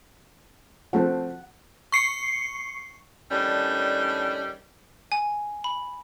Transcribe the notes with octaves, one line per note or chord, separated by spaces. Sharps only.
F3 A3 C4 F#5
C#6 C7 C#7
A2 D#3 G3 C#4 D4
G#5
B5